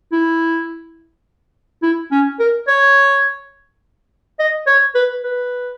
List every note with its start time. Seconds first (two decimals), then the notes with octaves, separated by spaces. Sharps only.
0.12 E4
1.83 E4
2.12 C#4
2.39 A#4
2.68 C#5
4.39 D#5
4.67 C#5
4.95 B4
5.24 B4